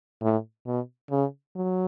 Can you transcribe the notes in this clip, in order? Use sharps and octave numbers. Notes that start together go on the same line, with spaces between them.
A2
B2
C#3
F#3